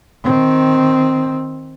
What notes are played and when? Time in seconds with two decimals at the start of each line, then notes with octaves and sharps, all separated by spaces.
0.24 D#3 C4